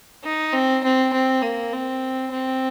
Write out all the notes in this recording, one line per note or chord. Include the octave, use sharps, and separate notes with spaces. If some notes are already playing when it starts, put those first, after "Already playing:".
D#4
C4
C4
C4
A#3
C4
C4